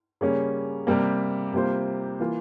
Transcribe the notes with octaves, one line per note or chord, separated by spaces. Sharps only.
C#3 G3 A#3 C#4
C3 G3 A#3
C3 G3 A#3 F4 C5
E3 A#3 F4